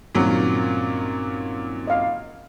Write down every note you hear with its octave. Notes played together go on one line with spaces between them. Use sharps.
G2 A#2 D#3 F#3 C4 C#4
D#5 F5